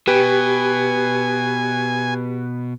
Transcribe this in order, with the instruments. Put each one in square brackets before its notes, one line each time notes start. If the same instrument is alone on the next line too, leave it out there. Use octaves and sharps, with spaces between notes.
[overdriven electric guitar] B2 [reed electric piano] G4 [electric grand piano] B4 [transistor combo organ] G#5